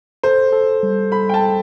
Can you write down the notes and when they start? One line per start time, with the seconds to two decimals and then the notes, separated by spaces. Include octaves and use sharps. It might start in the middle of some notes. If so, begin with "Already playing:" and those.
0.23 A4 C5
0.53 A4
0.83 G3
1.12 A4 B5
1.29 G5
1.34 A5
1.41 A4